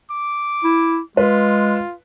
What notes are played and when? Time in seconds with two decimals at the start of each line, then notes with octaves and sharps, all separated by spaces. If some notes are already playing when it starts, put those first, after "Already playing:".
0.10 D6
0.64 E4
1.17 G#3 F4 B4